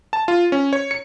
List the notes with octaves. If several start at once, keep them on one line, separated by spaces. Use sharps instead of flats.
A5
F4
C#4
C#5
C#7